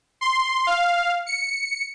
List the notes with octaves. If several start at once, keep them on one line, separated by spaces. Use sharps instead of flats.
C6
F5
C#7